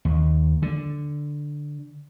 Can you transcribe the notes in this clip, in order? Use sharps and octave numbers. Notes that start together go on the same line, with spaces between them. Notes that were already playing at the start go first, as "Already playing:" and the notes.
D#2
D3